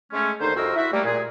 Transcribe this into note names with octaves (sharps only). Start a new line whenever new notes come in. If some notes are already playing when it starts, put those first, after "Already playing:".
G#3 A3 C#4
D#2 D3 D#4 C5
C2 F2 F#4 A#4 D#5 E6
E4 F#4 E5
G3 A3 A#3
A#2 G#4